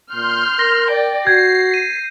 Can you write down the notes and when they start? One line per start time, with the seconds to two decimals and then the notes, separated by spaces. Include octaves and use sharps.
0.14 A#2 C6 F6 G6
0.59 A#4 A#6
0.91 D5 G5
1.27 F#4 G6 G#6 C7
1.74 D#7